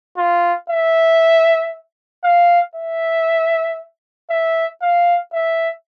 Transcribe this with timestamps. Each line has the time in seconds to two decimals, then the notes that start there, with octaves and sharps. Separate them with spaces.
0.18 F4
0.70 E5
2.24 F5
2.75 E5
4.30 E5
4.82 F5
5.33 E5